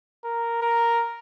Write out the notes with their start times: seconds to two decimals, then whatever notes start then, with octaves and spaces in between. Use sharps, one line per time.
0.24 A#4
0.62 A#4